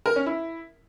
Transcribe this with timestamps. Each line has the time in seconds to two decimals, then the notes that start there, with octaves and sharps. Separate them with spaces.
0.06 A#4
0.16 C#4
0.26 E4